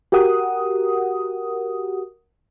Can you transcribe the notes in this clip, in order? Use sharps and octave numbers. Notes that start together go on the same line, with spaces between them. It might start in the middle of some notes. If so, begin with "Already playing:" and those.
F#4 G4 A#4 F#5 D#6